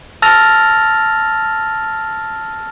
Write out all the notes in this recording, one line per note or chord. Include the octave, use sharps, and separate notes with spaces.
A5 E6 F6 A6 A#6 F7